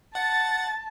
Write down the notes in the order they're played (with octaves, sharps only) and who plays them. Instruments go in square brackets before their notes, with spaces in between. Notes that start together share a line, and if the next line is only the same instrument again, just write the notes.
[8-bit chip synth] F#5 [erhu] A5 [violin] A6